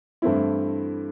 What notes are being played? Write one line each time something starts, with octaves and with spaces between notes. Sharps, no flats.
G2 E3 A3 C4 E4